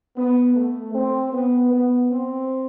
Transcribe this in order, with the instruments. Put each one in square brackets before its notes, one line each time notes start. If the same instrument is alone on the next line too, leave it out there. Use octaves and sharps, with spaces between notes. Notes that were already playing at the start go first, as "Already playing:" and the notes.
[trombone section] B3
A3
C4
B3
B3
C4